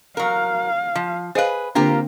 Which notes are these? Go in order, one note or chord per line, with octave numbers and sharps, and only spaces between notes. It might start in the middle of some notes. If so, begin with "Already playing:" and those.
F#3 A#4 F5
F3
G#4 B4 C5 D#5 F5
D3 A#3 C4 D4 F4 G4 A#4